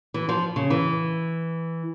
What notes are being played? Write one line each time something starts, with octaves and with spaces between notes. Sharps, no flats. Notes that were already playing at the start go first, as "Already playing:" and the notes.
E3
F3
C#3
E3